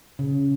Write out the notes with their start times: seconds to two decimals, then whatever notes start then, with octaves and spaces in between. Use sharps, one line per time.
0.19 C#3